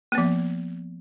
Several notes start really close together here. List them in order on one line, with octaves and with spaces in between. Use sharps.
A#3 B3 F3